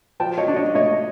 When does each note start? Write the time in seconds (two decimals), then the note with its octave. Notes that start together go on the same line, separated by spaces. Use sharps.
0.20 F3 G5 A5
0.38 C#5 D#5
0.48 D4
0.56 C#5 D#5
0.75 A3 C#5 D#5